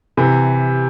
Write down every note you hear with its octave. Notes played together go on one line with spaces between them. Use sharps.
C3 E3